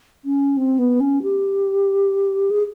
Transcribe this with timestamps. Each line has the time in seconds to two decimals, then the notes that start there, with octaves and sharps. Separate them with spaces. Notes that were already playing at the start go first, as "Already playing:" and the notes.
0.25 C#4
0.57 C4
0.79 B3
1.00 C#4
1.23 G4
2.51 G#4